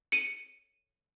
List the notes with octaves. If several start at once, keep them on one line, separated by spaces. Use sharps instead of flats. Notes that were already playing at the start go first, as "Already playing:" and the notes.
C#7 D#7